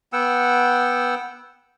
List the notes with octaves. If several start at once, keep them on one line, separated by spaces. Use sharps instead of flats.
B3 F#5 G5 E6